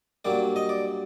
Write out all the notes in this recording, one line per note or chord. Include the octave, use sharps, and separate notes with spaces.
G2 F#3 A#3 D5
D#5
D5